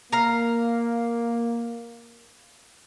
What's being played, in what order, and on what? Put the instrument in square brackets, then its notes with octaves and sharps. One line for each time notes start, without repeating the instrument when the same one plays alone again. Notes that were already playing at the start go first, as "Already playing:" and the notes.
[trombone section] A#3 [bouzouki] F5 A#5